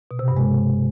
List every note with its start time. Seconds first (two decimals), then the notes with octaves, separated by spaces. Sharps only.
0.11 B2
0.19 C3
0.28 G2
0.37 G#3